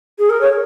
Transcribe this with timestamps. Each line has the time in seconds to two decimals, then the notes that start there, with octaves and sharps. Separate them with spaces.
0.19 G#4
0.30 A#4
0.41 C#5